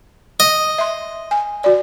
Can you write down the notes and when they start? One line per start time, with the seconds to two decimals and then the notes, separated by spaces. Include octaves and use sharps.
0.40 D#5
0.78 E5 C6
1.31 G#5
1.64 F#4 D5